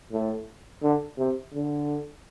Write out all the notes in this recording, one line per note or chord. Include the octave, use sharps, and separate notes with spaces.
A2
D3
C3
D3